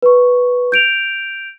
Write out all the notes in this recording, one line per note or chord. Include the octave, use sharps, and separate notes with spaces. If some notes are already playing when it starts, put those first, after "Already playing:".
B4 C#6
G6 D7 F7